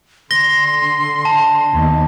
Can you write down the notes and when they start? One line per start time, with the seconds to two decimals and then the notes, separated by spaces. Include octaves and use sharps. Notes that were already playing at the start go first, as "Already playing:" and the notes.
0.31 D3 C6 A#6 G7
1.25 A5
1.75 D#2 B3 D#4